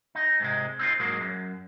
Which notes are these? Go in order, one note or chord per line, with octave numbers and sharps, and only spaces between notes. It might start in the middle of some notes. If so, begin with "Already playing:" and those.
D#4
G#2 C3 G#3
C4 D#4 F4
G#2 F#3 G#3 A#3
F#2